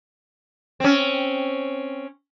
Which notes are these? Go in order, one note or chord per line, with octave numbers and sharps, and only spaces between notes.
C4 C#4